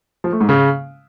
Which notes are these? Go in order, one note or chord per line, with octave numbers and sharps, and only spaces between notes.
F3
A3
G#2
C#3